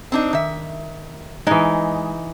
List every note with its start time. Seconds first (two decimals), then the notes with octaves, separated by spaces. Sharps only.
0.12 C4 D4 D#4
0.33 D#3 E5
1.47 E3 G#3 D#4